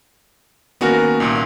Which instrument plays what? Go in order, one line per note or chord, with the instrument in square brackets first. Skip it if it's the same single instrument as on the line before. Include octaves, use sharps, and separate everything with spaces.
[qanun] D#3 A#3 C#4 [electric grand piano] B3 F#4 A#4
[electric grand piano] C2 A#2